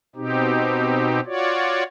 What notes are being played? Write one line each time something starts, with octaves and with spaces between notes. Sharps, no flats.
B2 C4 D#4 G4
F4 F#4 C#5 D5